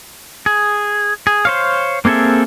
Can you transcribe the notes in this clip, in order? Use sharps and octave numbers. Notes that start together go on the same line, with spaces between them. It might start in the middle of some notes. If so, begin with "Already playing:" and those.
G#4
G#4
C5 C#5 F5
A#3 C4 G#4 A4 E5